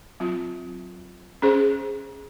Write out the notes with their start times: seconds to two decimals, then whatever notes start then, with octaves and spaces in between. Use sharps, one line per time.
0.20 F#3 C4 F4
1.42 C#4 G#4 C5